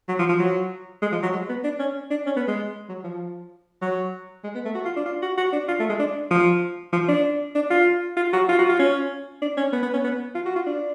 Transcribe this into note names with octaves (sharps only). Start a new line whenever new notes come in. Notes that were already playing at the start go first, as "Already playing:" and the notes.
F#3
F3
F3
F#3
G#3
F3
F#3
G#3
B3
D4
C#4
D4
C#4
B3
G#3
F#3
F3
F#3
G#3
B3
A3
F#4
F4
D4
F4
F#4
F#4
D4
F4
A3
G#3
D4
F3
F3
D4
D4
F4
F4
F#4
F4
F#4
F4
C#4
D4
C#4
B3
B3
C#4
B3
F4
F#4
F4
D4